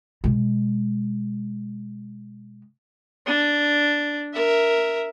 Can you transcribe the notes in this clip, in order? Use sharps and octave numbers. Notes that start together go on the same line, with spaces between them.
B2 G#3
D4
A#4 E5